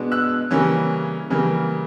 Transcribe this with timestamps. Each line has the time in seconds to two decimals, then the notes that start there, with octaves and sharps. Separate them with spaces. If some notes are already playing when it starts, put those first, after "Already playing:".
Already playing: B2 G#3 B3 D4
0.12 E6 F#6
0.51 C#3 E3 G3 A#3 C#4
1.30 C#3 E3 G3 A#3